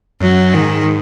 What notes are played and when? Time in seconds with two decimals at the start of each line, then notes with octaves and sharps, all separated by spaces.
0.21 F#2 F#3
0.53 G#2 D#3